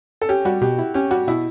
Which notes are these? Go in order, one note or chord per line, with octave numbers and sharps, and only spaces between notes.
A4
C#4 G4
G3 F#4
B2 G4
E4
C#4 G4
G3 F#4
B2 E4